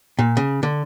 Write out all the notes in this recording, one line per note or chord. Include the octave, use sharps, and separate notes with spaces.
A#2
C#3
D3